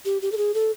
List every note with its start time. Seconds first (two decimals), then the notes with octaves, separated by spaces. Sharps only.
0.05 G4
0.22 G4
0.32 A4
0.37 G#4
0.54 A4